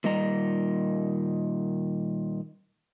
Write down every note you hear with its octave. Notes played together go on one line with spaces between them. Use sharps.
A#2 D#3 G3 D#5 A#5